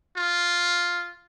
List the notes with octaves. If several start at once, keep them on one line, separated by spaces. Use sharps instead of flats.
F4